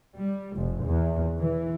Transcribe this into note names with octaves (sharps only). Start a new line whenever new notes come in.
G3
F1
E2
E3